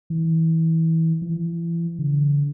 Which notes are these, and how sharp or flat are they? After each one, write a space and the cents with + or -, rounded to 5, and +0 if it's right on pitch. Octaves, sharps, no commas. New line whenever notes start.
E3 -25
E3 +35
D3 -35